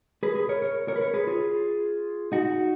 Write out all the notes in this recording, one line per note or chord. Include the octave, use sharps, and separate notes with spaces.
G#4 B4
G#4 B4
A#4 C#5
A#4 C#5
A#4 C#5
B4
A#4 C#5
G#4 B4
F4 G#4
D#4 F#4